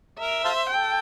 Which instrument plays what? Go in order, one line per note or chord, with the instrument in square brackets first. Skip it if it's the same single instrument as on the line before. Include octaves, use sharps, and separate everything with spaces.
[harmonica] A#4 [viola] E5
[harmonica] F4 A4 C5
[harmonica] A4 [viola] G5